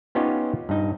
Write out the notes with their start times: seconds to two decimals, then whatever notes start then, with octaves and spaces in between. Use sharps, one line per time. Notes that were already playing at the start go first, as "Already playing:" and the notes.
0.15 B3 C#4 D#4 F4 G4 C#5
0.69 G2 D#4